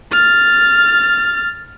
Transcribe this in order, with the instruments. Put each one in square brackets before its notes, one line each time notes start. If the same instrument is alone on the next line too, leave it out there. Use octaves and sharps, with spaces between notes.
[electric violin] F6 A6